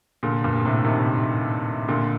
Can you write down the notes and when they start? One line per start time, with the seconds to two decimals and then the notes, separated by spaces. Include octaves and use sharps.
0.23 A#2 D3
0.44 G2 A#2
0.60 A#2
0.65 A2 C3
0.84 C3 D#3
1.88 A#2 D3